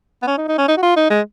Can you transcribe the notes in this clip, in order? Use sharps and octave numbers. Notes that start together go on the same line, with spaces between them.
B3
C#4
D#4
D#4
C#4
D#4
F#4
F4
D#4
G#3